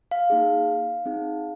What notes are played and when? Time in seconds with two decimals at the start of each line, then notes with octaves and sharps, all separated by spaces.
0.11 F5
0.30 A#3 D#4 G#4
1.06 C4 D#4 G#4